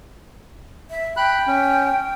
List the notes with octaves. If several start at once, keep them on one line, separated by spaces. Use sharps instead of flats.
E5
G5 B5 F#6
C#4